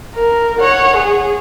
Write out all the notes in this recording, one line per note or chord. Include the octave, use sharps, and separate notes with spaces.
A#4
C#5 F#5
G#4